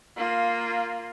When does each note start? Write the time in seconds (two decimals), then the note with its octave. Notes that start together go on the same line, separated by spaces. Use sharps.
0.17 A#3 F4